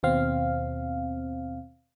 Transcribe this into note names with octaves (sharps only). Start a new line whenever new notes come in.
D#2 B2 C4 F5